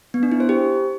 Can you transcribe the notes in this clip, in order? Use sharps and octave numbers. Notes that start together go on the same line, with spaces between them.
B3
D4
E4
C5
G4